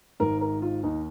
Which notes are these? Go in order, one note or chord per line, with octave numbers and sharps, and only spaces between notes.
G#1 G#2 D#3 A#4
A#4
F4
D#2 D#3 D#4